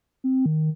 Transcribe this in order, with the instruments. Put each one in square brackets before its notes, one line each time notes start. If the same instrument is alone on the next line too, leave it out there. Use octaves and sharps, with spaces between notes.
[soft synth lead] C4
D#3